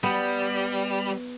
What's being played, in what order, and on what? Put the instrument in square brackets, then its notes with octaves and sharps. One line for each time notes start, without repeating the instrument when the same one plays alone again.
[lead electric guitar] G3 [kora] B3